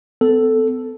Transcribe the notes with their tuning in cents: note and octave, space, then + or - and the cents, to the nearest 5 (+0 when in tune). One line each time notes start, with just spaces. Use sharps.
B3 +40 A4 +0